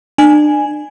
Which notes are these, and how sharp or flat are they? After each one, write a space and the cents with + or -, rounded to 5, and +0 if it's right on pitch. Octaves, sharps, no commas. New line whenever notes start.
D4 +35 G#5 +0